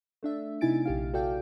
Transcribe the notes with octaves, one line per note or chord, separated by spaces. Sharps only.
A3 D4 E5
C3 D#4 E4 G#5 A6 D7
A#1 G4 F5
F#4 A4 D5 F5 G5